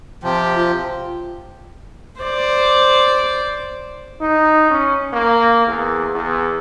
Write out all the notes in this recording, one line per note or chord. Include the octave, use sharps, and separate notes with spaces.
C3 F3 G4
F4
C5 D5
D#4
C#4
A#3
E2
E2